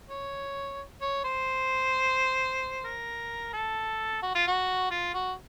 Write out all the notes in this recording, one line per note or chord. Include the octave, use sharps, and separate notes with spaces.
C#5
C#5
C5
A#4
A4
F#4
F4
F#4
F4
F#4